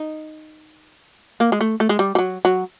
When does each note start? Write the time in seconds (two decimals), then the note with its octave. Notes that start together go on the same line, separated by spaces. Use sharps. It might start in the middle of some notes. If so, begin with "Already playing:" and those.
Already playing: D#4
1.40 A#3
1.52 G#3
1.61 A3
1.80 A3
1.89 G#3
1.99 G3
2.15 G3
2.19 F#3
2.45 F#3